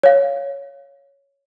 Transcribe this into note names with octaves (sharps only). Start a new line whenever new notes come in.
C#5 F5